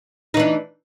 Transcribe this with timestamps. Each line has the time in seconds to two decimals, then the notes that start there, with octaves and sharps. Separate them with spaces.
0.34 D#4
0.37 E3
0.40 D4